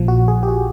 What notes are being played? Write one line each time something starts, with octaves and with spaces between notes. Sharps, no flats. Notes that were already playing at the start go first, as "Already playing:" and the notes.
Already playing: A#1 A#2 F3
F#4
G#4
G4
F#4